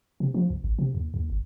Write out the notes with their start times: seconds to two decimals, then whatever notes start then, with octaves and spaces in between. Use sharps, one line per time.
0.20 C3
0.34 F3
0.50 C2
0.64 G#1
0.79 C3
0.95 D#2
1.14 D#2
1.30 G1